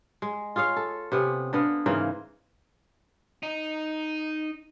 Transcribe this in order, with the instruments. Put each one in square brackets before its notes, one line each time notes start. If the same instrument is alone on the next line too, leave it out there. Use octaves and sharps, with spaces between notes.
[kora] G#3
F4 G#4 C#5 F5
A4
C3 B3 C#4
D3 B3 F5
G#2 C#3 E3 A#3
[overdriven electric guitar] D#4